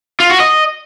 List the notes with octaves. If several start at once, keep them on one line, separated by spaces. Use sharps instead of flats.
F4
F#4
D#5